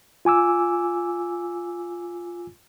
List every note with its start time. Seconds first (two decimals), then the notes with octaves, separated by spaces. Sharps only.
0.25 F4 G#5 D6 E6